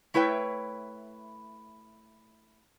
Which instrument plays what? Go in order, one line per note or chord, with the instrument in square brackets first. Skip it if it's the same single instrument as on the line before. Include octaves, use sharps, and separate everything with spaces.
[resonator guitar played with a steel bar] A3 E4 B4 C#5 G5